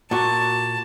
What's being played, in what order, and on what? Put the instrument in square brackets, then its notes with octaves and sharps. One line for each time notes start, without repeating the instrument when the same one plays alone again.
[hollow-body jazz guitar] A#2 F#4 [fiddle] A5